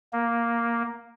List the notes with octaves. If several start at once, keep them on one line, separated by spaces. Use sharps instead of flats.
A#3